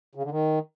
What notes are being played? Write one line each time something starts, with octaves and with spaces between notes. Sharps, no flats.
C#3
D3
D#3